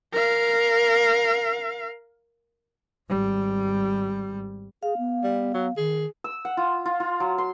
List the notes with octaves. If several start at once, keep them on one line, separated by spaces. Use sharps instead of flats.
A#4 F5
G#1 G3
G#4 F5
B3
G3
F#3
D#3 G#4
E6
F#5
F4
F4
F4
F#3
C6